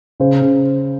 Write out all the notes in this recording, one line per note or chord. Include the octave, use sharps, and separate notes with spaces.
C#3 C5
C#3